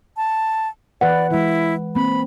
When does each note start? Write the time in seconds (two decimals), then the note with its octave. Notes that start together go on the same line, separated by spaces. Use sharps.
0.17 A5
1.01 E3 B4 D5 F#5
1.31 E3 G#3 E4
1.95 A#3 C4 B5